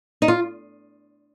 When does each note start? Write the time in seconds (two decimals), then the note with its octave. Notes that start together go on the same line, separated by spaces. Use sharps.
0.22 D#4
0.28 F4